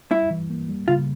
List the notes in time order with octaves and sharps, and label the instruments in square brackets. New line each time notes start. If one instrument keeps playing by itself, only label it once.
[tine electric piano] G3 [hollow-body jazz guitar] E4
[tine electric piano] E3
A#3
G3
[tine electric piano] C#3 [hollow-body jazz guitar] F4